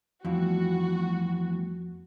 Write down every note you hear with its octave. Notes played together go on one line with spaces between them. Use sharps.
F2 E3 F3 G3 A3 B3 F#4